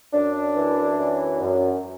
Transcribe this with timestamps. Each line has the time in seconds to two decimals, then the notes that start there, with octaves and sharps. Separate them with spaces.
0.14 F#2 D4
0.57 E3
0.99 F#2
1.41 F#2